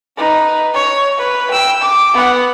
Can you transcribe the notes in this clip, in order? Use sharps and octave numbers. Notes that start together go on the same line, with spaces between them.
D#4 B4
C#5
B4
G5 E6
D6
B3 F#5